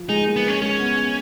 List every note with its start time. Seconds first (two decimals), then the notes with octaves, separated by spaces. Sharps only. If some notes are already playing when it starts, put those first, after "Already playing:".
Already playing: F3 F4
0.09 G#3 D#4 G#4
0.27 A#3 A#4
0.36 B3
0.48 C#4
0.61 G#3 C#4 G#4
0.79 B3
0.96 B3